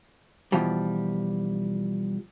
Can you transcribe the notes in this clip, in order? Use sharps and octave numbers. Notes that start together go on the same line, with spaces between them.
B2 E3 F3 G3